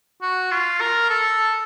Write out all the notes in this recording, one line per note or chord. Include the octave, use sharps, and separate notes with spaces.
F#4
F4
A#4
A4